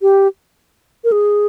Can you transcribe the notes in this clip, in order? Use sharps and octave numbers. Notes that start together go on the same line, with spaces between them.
G4
A#4
G#4